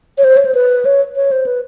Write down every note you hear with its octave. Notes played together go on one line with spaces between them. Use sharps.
C#5
C5
C#5
C5
B4
C#5
C#5
C5
B4